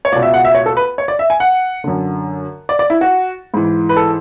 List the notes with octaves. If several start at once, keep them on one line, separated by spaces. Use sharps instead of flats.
C#5
C#2 B2 D5
E5
F#5
E5
C#5
A4
B4
C#5
D5
E5
G#5
F#5
F#2 D3
D5
D5
E4
F#4
G#2 E3
B4
A4